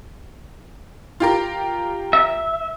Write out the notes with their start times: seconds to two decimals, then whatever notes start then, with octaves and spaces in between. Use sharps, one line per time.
1.20 F4 G4 A#4
2.13 E5